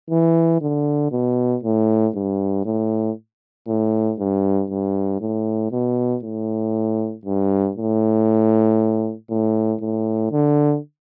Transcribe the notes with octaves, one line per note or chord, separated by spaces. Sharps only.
E3
D3
B2
A2
G2
A2
A2
G2
G2
A2
B2
A2
G2
A2
A2
A2
D3